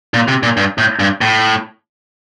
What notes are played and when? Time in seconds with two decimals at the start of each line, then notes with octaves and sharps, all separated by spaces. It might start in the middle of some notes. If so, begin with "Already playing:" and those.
0.14 A#2
0.28 C3
0.43 A#2
0.57 G2
0.78 A2
1.00 G2
1.21 A2